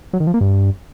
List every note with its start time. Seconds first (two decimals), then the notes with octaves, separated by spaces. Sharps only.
0.13 F#3
0.20 D#3
0.27 F3
0.34 A#3
0.41 G2